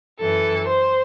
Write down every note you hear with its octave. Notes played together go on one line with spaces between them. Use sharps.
F#2 E3 A4
C5